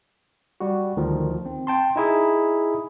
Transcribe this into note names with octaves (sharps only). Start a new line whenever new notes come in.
G3 F#4
D2 D#3 F3
C4
G5 A5 C6
D#4 E4 G#4